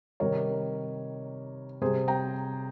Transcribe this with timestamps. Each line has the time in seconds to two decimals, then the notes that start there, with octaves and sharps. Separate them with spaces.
0.20 C3 D#3 G3 A#4 C#5
1.81 C3 G3 G#4 C5
2.08 G5 A#5